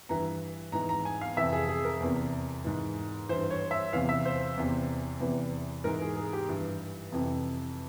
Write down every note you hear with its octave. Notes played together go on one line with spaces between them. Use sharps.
G2 E3 A#5
G#2 E3 A#5
A#5
G#5
F5
F2 C3 E3 E5
G#4
G#4
A#4
E2 C3 E3
G#2 E3
G2 E3 C5
C#5
E5
E2 C3 E3 F5
E5
C5
E2 C3 E3
E2 C3 E3
G#2 E3 A#4
G#4
G#4
G4
G2 E3
F2 C3 E3